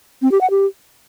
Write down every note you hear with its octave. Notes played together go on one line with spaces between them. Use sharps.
C4
G4
F#5
G4